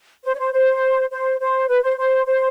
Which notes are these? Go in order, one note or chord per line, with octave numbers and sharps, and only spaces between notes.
C5
C#5
C5
C5
C5
C5
B4
C5
C5
C5